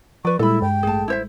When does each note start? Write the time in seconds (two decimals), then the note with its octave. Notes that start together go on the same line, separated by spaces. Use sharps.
0.25 F3 B4 D5 C#6
0.39 A#2 G3 G#3 E4 A4 B5
0.62 G2 G5
0.83 A1 A3 G#4 A5
1.08 E4 C5 E5